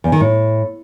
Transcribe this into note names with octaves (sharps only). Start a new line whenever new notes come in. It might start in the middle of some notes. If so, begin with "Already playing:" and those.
E2
D#3
A2